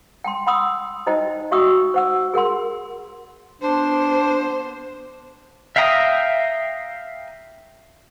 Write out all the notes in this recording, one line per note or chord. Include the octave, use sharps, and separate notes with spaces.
G5 A5 C6
F#5 B5 C6 D#6 E6
D#4 E4 C5 D#5 G5 A5
F#4 E5 G5 C#6 D#6 E6
C5 F#5 E6
G#4 A#4 F#5 C6
B3 D4 C5
E5 F5 G5 A#5 D#6